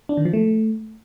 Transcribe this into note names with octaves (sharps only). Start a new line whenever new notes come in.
D4
D#3
F3
A3